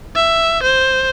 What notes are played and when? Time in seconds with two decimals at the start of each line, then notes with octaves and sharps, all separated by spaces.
0.15 E5
0.63 C5